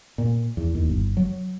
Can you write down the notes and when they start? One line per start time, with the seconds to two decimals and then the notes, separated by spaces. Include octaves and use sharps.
0.18 A#2
0.57 E2
0.75 D#2
0.90 G1
1.17 F#3